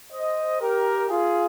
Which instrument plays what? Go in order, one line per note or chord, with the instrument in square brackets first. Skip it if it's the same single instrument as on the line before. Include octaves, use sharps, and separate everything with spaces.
[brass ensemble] C5 D#5
G4 A#4
F4 G#4